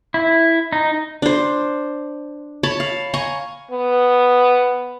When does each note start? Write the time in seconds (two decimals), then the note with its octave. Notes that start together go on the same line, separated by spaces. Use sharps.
0.14 E4
0.73 D#4
1.22 D4 C5
2.63 C#5 A5 B5
2.80 F5
3.14 G#5 A#5 C#6
3.71 B3